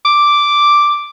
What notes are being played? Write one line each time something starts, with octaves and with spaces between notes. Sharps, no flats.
D6